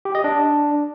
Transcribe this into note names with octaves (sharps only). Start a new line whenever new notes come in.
G4
D#5
D4